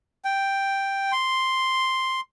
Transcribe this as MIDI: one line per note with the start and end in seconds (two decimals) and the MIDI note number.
0.25 1.12 79
1.12 2.21 84